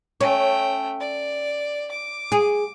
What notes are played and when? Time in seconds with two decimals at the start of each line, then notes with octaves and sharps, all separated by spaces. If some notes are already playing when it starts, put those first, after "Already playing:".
0.21 A3 C#4 G5
1.01 D5
1.91 D6
2.32 G#4